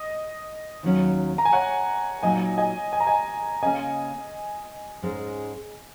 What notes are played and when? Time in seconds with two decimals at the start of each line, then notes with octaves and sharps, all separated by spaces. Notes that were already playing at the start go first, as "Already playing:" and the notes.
Already playing: D#5
0.83 D#2 D#3 F#3 C#4
1.38 A#5
1.45 G#5
1.53 C#5 F#5
2.23 A#2 F#3 D#4 D#5 G#5
2.58 D#5 G#5
2.93 G#5
3.00 A#5
3.07 D#5 G#5
3.62 C#3 A#3 C#4 D#5 G#5
5.02 G#2 G#3 C#4